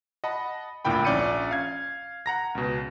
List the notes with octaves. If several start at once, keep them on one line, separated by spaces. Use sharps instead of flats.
D#5 F#5 A5 B5
G#1 D2 A#2 E4 G5 B5
A#1 C#4 D5 G6 C#7 D#7
F5 G#6
F#5 A#5 A#6
C#2 B2